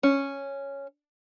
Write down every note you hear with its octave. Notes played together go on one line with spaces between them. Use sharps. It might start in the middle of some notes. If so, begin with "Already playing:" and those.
C#4